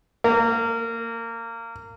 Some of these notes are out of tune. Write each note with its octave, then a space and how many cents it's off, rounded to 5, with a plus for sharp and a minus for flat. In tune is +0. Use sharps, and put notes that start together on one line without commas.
A#3 -25